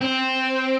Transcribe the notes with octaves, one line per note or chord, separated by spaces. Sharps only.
C4